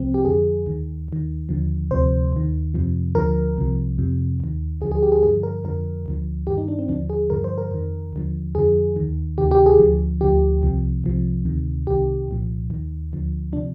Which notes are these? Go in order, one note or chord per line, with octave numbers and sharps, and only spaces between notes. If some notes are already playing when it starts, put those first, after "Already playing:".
Already playing: C2 C3 F3 C4
G4
F2 D3 F3 G#4
D#2 D#3
D#2 D#3
D#2 D3 F3
D2 C3 F3 C5
D#2 D#3
F2 C3 F3
D2 D3 F3 A#4
C2 C3 F3
F2 C3 F3
D#2 D#3
D2 D3 F3 G#4
G#4
G4
G#4
G2 D3 F3 G#4
A#4
F2 D3 F3 A#4
D2 D3 F3
G2 D#3 G4
D#4
D4
C4
D#2 D3 F3 D4
G#4
G2 D3 F3 A#4
C5
A#4
F2 D#3
D#2 D3 F3
F2 D3 F3 G#4
D#2 D#3
D2 C3 D#3 G4
G4
G#4
D2 D3 F3
D2 D3 F3 G4
C2 C3 F3
C2 C3 F3
D2 C3 D#3
C2 C3 D#3 G4
C2 A#2 F3
D#2 D#3
D2 D3 F3
C3 F3 D4